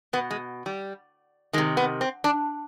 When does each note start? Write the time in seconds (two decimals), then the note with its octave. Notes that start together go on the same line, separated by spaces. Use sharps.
0.13 B2 B3
0.31 G#3
0.66 G3
1.53 D#3 G#3
1.58 C3
1.77 B3
2.01 C4
2.24 D4